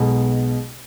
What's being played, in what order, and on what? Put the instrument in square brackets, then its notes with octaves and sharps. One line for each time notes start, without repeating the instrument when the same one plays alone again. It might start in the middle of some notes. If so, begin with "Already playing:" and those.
Already playing: [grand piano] B1 B2 G#3